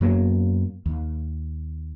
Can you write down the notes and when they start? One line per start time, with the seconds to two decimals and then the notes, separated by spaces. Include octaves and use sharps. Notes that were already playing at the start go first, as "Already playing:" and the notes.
0.01 F#2 F#3 A#3 B3
0.86 D#2